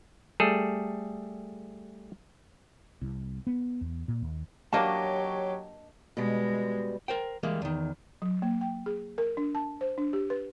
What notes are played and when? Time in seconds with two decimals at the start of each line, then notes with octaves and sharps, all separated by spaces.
0.40 G3 A3 G#4 A4
3.02 C2
3.47 B3
3.81 E2
4.08 A#2
4.22 D#2
4.73 F#3 A#3 D4 F#4 G4 C#5 D#5 A5
6.17 B2 G3 G#3
7.08 A#4 C5 G5
7.43 E3 G3 G#3 A#3
7.62 E2 D#3
8.22 F#3
8.42 A#3
8.61 G5
8.86 G#4
9.18 A#4
9.37 D4
9.55 A5
9.81 C5
9.98 D4
10.13 G4
10.30 B4